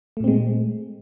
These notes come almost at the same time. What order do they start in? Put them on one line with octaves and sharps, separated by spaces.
A3 A#2 C4 G#3